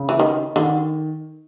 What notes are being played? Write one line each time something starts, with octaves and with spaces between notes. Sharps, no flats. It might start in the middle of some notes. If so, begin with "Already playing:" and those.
Already playing: C#3
E3
D#3
D3 D#3